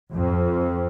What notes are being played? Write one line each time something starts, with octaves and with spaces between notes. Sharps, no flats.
F2